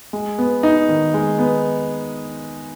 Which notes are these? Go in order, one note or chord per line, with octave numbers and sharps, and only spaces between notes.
G#3
B3
D#4
D#3
G#3
B3